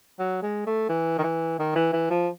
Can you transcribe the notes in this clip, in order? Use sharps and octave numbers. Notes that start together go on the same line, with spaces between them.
F#3
G#3
A3
E3
D#3
E3
D#3
E3
E3
F3